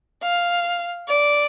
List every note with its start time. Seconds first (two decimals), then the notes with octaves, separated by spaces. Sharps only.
0.23 F5
1.09 D5